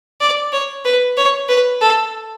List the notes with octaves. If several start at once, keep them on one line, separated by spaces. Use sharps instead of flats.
D5
C#5
B4
C#5
B4
A4